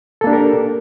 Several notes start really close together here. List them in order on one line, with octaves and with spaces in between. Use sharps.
A4 A#3 D4 G4 A#4